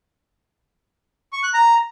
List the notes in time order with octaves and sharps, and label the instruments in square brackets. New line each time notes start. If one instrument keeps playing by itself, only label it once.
[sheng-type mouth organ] C#6
F#6
A#5